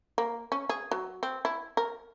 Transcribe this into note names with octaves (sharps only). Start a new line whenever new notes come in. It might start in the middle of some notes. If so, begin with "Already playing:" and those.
A#3
C#4
G#4
F#3
C4
E4
A#4